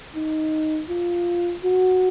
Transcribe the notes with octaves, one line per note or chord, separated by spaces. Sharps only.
D#4
F4
F#4